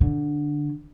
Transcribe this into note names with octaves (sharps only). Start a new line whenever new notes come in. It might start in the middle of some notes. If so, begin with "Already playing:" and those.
D3